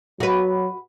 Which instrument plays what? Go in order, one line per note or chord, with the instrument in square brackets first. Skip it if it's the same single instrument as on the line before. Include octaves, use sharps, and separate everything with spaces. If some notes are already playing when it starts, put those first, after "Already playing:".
[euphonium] F#3 [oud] F#4 B4